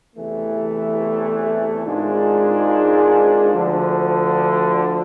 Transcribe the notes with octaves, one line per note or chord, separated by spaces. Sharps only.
E2 C3 E3 A3
G#1 G#2 G#3 D4 F4
D2 D3 F3